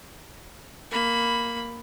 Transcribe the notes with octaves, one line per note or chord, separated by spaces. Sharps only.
A#3 B5